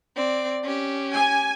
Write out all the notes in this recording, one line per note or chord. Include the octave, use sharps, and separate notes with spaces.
C4 D5
C#4 G4
G#5